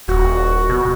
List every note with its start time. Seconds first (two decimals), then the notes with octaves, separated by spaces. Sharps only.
0.08 D#1 F#4
0.70 B2